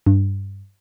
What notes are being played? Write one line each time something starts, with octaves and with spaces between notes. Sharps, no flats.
G2